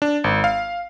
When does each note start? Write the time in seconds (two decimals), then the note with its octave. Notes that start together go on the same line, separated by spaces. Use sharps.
0.02 D4
0.24 G#1
0.44 F5